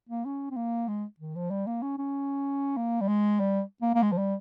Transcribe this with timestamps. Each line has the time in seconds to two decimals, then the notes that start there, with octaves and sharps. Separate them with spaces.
0.09 A#3
0.25 C#4
0.50 C4
0.56 A#3
0.88 G#3
1.20 D#3
1.35 F3
1.51 G3
1.66 A#3
1.82 C#4
1.98 C#4
2.77 A#3
3.01 G3
3.08 G#3
3.40 G3
3.82 A#3
3.95 A#3
4.02 G#3
4.12 F3
4.18 G3